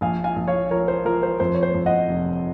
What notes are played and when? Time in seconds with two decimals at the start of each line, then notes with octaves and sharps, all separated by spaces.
0.01 A#1 F5 G#5
0.24 F5 G#5
0.36 A#1
0.48 C#5 F5
0.71 F3 A#4 C#5
0.88 C5
1.05 F3 A#4
1.23 C5
1.40 F2 C5
1.54 C#5
1.63 C5
1.74 F2
1.86 D#5 F#5
2.09 F1